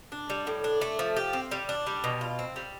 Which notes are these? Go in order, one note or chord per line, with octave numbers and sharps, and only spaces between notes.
D4
G3
A2
D4
A3
F3
G4
C4
G3
D4
G3
B2
F4
C4
G3